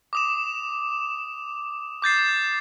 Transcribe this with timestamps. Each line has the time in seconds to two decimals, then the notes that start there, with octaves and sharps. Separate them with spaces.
0.13 D6 D#6 E7
2.02 D6 G6 A6 C7